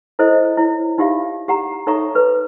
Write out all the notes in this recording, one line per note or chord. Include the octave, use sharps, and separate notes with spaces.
E4 A4 C5 D#5
E4 C#5
D#4 F4 G4 E5 F5
G4 F#5 A#5
D#4 A4 C#5 E5 A#5 C#6
A4 B4